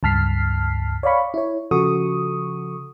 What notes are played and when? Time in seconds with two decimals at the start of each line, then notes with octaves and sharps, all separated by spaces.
0.03 C#2 G2 A5 F6 B6 C7
1.03 C#5 D5 F5 B5 C#6
1.34 E4 C#5
1.71 C#3 F3 F#4 A4 C#6 D#6